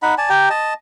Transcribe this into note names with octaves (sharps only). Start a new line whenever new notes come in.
D#4 F#5 B5
D5 G#5 A5
G4 G5 A#5
D#5 A5